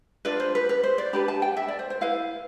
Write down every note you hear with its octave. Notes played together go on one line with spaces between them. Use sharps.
D4 F4 B4 D5
C5
B4
B4
C5
D5
D4 G4 B4 B5
A5
G5
E5
D5
C5
C5
E4 B4 F5